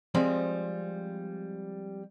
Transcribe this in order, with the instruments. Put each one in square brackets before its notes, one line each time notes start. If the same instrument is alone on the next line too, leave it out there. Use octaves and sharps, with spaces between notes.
[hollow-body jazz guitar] F3 G3 G#3 C4